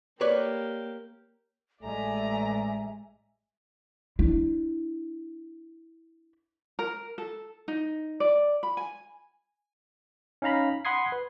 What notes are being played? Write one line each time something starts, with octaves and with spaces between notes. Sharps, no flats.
A#3 G4 B4 C#5 D5
A1 G#3 A3 D5 E5 G#5 A#5
D4 E4
A#4
A4
D#4
D5
B5
G#5
C#4 D#4 F5 A#5 B5
F#5 B5 C6 D#6 G#6 C7
B4